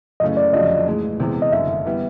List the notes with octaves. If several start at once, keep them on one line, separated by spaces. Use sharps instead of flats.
F#2 C#3 E3 A3 C#4 D#5
D5
G1 F2 C#3 F#3 D#5
A2 E3 G#3
E2 C3 E3 G#3 B3
D#5
F#1 F#2 D3 E5
E3 G3 B3